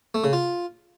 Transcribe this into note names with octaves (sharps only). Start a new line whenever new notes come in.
A3
C#3
F4